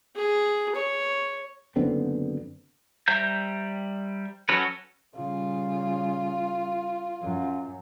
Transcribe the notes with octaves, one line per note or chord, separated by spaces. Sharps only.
G#4
C#5
F#1 D3 B3 C4
G3 C5 E5 A#5 G6
F#3 C#4 F#4 A4 B4
C#3 G3 F4
F#2